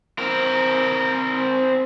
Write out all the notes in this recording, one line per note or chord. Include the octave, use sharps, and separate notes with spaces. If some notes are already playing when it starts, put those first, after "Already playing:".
C4 A#4